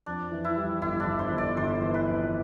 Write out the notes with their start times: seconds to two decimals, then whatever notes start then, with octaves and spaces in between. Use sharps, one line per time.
0.06 F2 D4
0.32 E3
0.44 E4
0.56 G3
0.81 G1 E4
1.00 D4
1.07 G1
1.19 C5
1.32 G1
1.38 D5
1.56 G1 C5
1.81 E3
1.94 B4
2.07 F2